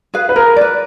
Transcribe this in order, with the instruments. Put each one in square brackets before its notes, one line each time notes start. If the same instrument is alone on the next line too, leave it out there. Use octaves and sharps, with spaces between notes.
[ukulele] G#4 B4 F5
[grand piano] B4
[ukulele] G#4 [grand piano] A#4
[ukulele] B4 D5